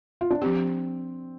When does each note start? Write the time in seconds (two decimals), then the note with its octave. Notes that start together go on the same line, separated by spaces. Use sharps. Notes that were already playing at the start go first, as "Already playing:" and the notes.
0.21 F4
0.30 D4
0.42 F3 C4 D4 G4